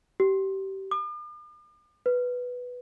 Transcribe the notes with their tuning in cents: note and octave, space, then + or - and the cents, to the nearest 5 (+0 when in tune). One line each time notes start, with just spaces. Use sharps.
G4 -25
D6 +45
B4 +0